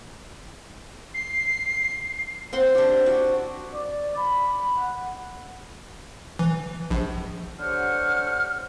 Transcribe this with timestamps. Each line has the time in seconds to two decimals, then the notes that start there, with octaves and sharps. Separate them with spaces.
1.14 C7
2.53 C4 F#5 C6
2.75 D4 G4
3.06 F#4
3.73 D5
4.17 B5
4.77 F#5
6.39 E3
6.90 A#1
7.60 D3 G4 C5 C#5 F#5 F6